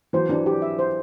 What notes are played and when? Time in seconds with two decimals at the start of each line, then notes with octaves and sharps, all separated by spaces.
0.13 E3 F#3 C5
0.29 E3 F#3 D4
0.46 G4
0.62 E5
0.79 C5